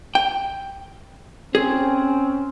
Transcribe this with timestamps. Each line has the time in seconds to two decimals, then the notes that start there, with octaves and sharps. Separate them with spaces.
0.15 G5
1.55 C4 C#4 G#4